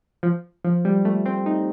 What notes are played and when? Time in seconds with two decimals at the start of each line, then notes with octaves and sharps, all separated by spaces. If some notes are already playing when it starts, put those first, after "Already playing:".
0.23 F3
0.64 F3
0.85 G3
1.05 A3
1.26 C4
1.46 D#4